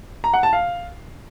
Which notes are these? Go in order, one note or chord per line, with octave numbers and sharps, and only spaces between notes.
A#5
F#5
A5
F5